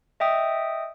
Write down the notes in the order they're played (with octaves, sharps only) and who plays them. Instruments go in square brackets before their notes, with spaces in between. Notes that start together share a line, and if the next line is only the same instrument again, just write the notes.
[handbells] D#5 E5 G5 D#6